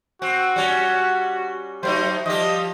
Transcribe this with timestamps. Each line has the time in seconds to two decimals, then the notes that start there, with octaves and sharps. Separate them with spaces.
0.22 C4 F#4
0.56 G3 C#4
1.83 F#3 A3 D#4 C5
2.26 F3 G3 G4 D#5